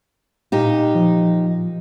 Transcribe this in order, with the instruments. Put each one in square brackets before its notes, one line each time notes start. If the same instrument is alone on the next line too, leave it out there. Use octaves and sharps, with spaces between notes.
[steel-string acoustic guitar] A#2 D#4 G4
[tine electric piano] F3